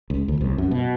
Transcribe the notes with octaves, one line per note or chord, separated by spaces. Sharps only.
C#2
D2
C2
F#2
B2